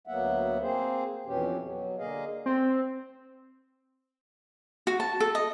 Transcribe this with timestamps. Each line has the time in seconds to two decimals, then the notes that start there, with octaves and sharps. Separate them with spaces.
0.07 D2 F#3 A#3 B3 E5 F#5
0.62 A#3 C4 G#4 C5
1.26 F2 B2 E3 C#4 G4
1.62 B2 F#3
1.98 D3 A#3 G#4 D#5 F5
2.46 C4
4.87 F#4
5.00 A5
5.20 A4
5.35 D#5